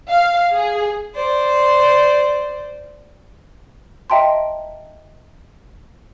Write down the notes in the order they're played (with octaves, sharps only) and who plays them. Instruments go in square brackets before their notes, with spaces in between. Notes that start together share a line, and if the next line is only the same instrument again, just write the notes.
[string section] F5
G#4
[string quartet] C5 D5
[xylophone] D#5 E5 G5 A5 A#5 C6